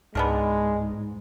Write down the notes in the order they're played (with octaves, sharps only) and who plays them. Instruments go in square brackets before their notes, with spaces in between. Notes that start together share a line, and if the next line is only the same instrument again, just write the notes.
[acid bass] C#2 [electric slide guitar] G#2 [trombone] G#3 [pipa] B3 D4 A#4